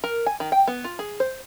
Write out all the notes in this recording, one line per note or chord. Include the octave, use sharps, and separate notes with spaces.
A#4
G#5
D#3
G5
B3
F4
G#4
C5